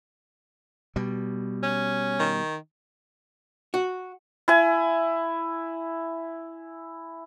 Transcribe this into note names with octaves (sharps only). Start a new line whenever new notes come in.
B2 G3
C#4
D#3
F#4
E4 G#5